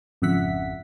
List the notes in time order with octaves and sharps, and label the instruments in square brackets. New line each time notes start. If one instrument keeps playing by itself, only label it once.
[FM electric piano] G#1 F2 C#3 E5 F#5 B6